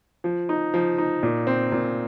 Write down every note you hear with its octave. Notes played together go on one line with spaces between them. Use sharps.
F3
D#4
F3
D#4
A#2
C4
A#2